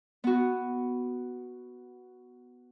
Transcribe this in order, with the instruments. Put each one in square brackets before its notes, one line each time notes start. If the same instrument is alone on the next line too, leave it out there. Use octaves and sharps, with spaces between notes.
[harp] B3 F#4